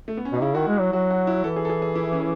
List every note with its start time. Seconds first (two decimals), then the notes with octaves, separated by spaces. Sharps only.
0.08 A3
0.17 B3
0.25 C#4
0.33 B2 D#4
0.42 C#3 E4
0.55 D#3 F#4
0.68 G#3
0.80 F#3
0.93 F#3 F#4
1.11 F#4
1.27 E4
1.44 E3 A4
1.56 G#4
1.65 A4
1.69 G#4
1.82 G#4
1.95 E4
2.13 C#4